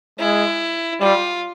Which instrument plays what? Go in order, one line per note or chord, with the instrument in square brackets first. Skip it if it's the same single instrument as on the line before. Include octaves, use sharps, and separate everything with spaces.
[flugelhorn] G#3 [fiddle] E4
[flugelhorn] G3 [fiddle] F4